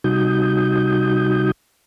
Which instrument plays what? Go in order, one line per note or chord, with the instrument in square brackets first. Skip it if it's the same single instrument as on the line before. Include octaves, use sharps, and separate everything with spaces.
[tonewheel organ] C3 G3 D#4 F#4 D#6 G6